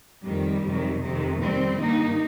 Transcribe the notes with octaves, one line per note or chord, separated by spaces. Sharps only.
F2 D#3 G3
F2 C3 D#3
F2 C3 D#3
F2 C3 D#3 G3 C4
G2 D#3 A#3 D#4